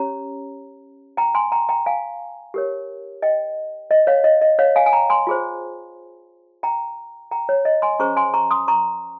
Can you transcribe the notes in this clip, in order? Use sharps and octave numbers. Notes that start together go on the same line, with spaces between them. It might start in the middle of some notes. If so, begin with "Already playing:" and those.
Already playing: C#4 G4 C#5 A#5
G5 A#5
G#5 C6
G5 A#5
G5 A#5
F5 G#5
G4 A#4 C#5
D#5 G5
D#5
C#5 F5
D#5
D#5
C#5 F5
F5 G#5
G#5
G5 A#5
G#5 C6
F4 G#4 C5
G5 A#5
G5 A#5
C#5
D#5
G#5 C6
C#4 G#4 C5 A#5 C#6
G#5 C6
A#5 C#6
C6 D#6
A#5 C#6